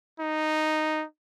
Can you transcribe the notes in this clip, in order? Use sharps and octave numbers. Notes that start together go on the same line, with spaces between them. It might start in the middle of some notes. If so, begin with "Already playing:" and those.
D#4